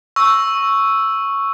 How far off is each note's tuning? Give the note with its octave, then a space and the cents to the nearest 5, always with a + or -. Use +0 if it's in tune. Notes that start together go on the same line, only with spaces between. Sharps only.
C#6 +0 E6 +0